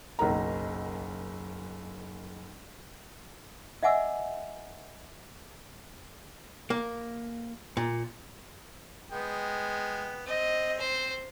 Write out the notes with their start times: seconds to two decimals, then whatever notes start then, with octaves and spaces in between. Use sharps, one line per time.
0.19 F#1 B1 A#4 A#5
3.83 D#5 E5 F#5 G#5 D6 E6
6.70 A#3
7.77 A#2
9.12 G#3 B3 G5
10.26 C4 D#5
10.79 C5